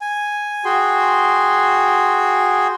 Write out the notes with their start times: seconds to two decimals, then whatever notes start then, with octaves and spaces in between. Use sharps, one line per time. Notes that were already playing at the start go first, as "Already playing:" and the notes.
0.01 G#5
0.65 F#4 G#4 G5 C6